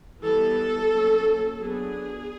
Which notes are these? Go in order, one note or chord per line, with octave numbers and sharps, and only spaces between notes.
E3 G3 B3 A4
F#3 A#3 C#4
F#3 B3 D4 G#4